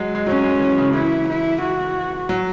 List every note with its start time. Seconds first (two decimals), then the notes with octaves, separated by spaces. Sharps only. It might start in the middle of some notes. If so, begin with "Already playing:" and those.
Already playing: F#3 G#3
0.15 G#3
0.27 F#3 C#4
0.44 G#3
0.60 E3
0.78 C#3
0.94 E3 E4
1.29 E4
1.62 F#4
2.29 F#3